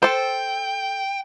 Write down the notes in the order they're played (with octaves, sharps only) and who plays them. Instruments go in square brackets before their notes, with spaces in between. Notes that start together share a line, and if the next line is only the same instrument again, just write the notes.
[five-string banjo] A4 C5 [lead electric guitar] G5